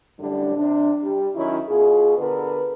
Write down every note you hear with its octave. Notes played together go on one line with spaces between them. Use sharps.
F#2 A2 D3 G3 D4
C3 D4
G3
D#3 F#3 C#4 E4
B2 F4 G#4
D3 B3 A#4 B4